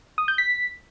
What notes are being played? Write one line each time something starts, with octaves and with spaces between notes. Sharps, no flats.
D#6
G6
B6